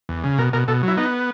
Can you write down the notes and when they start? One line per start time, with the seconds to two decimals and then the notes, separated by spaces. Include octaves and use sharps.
0.09 E2
0.24 C#3
0.38 B2 A#4
0.53 B2 A#4
0.68 B2 A4
0.83 F#3 E4
0.97 B3 D#4